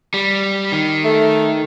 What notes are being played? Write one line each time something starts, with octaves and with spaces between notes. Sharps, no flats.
G3
D#3
A3